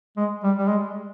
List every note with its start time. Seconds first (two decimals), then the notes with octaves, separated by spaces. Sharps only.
0.17 G#3
0.43 G3
0.58 G3
0.69 G#3